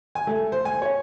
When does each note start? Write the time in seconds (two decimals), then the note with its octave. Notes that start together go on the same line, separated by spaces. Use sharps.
0.15 G#5
0.27 A3
0.52 C5
0.65 G#5
0.82 C#5